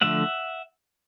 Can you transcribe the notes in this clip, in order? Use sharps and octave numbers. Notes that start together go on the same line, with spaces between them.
D3 F3 A3 E5 F#5